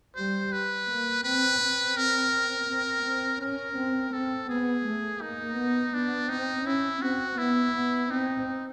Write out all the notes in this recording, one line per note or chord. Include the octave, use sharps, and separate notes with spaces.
G3 C5
B4
A#3
C4 B4
C4
A#4
C4
C4
C#4 A#4
C4
C4 A4
B3 G#4
A3
A#3 D#4
B3
B3 D4
C4 D#4
C#4 E4
C4 F#4
B3 E4
B3
C4 D#4